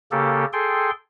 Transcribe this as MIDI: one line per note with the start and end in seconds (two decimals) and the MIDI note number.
0.12 0.45 49
0.12 0.45 58
0.12 0.45 67
0.12 0.45 69
0.53 0.91 68
0.53 0.91 69
0.53 0.91 79
0.53 0.91 84